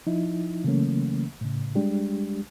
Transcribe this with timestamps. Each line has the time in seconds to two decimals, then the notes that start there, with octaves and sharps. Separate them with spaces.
0.07 F3 D#4 E4
0.64 C#3 E3 F#3 A3 A#3 C#4
1.41 A2 C#3
1.75 G3 G#3 D4 G4